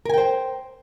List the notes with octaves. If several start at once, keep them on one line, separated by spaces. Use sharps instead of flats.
A#4 C5 G5 G#5